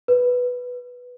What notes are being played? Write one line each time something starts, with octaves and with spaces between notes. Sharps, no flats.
B4